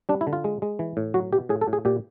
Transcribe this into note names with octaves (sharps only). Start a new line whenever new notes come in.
G3 D4
E4
D3
F4
G#3
G#3
E3
A2
F#3 F#4
B2 G4
A2 G#4
A4
A2
G#4
A#2 G4